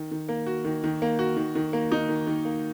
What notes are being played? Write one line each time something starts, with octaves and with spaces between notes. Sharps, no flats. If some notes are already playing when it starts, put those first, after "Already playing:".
Already playing: D#3
D#3
A#3
F#4
D#3
D#3
A#3
F#4
D#3
D#3
A#3
D#4
D#3
D#3
A#3